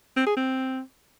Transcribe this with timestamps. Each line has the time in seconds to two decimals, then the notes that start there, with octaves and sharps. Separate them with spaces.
0.16 C4
0.26 G#4
0.37 C4